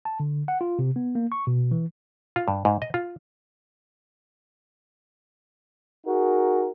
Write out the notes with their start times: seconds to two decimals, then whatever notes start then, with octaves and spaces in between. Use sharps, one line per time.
0.05 A5
0.20 D3
0.48 F#5
0.61 F4
0.79 C3
0.96 B3
1.15 A#3
1.32 C#6
1.47 B2
1.71 E3
2.36 F4
2.48 G2
2.65 G#2
2.82 D#5
2.94 F4
6.06 D#4 F#4 G#4 A#4